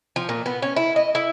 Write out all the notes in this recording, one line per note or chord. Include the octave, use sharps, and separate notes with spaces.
F3
A#2
B3
C#4
E4
D#5
E4